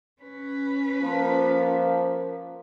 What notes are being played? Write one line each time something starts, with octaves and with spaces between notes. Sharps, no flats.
C#4 B4
F3 A#3